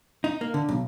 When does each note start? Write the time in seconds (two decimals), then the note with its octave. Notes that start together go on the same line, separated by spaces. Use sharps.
0.24 D#4
0.41 A#3
0.54 D3
0.69 B1